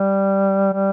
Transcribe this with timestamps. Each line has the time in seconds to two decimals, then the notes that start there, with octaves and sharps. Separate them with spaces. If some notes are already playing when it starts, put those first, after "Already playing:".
Already playing: G3
0.73 G3